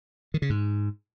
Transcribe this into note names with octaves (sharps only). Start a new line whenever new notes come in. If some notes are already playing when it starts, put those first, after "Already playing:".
D#3
C#3
G#2